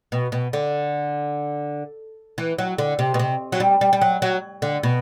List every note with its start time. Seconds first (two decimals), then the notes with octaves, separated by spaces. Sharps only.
0.12 B2
0.32 B2
0.53 D3
2.38 E3
2.58 F#3
2.78 D3
2.99 C3
3.14 B2
3.19 C3
3.52 F#3
3.60 G3
3.81 G3
3.93 G3
4.02 F#3
4.22 F#3
4.62 D3
4.83 B2